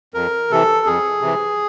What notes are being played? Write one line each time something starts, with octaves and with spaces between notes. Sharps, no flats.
F2 A#4
C3 E3 A4
F2 G#4
C3 E3